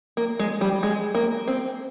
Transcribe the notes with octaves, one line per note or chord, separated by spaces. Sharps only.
A#3
G#3
G3
G#3
A#3
C4